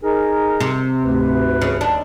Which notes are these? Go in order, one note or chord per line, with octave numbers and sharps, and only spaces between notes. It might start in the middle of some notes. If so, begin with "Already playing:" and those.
D#4 G#4 A#4
C3
D2 G#2 B4
C#3
D#2 D4